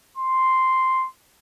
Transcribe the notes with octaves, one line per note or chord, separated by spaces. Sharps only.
C6